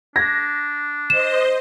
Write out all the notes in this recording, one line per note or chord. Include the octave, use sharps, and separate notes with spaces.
D4 G#6 A#6
C5 D#5 E7